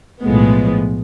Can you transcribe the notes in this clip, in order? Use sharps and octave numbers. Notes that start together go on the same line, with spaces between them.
B1 A2 F3 G#3 B3